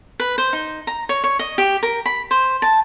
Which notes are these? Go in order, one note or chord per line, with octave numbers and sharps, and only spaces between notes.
B4
C5
D#4
A#5
C#5
C#5
D#5
G4
A#4
B5
C5
A5